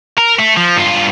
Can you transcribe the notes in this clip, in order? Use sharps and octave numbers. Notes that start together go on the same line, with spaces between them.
A#4
A3
F3
G2 F4